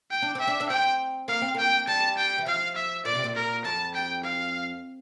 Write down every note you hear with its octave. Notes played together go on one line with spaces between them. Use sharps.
G5
D4
C4 E5
D4
D4
C4 G5
A#3 F5
C4
A#3 G5
G3 A5
G5
E3
F3 F5
E5
A#2 D5
C3
A#2
A#4
F2 A5
G5
F5